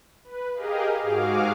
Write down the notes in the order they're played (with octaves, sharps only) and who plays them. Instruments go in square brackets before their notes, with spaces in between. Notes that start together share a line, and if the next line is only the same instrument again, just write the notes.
[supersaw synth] B4
G4 G#4 A#4 D#5 F5
G#2 F#4 G#4 F5 D6 F6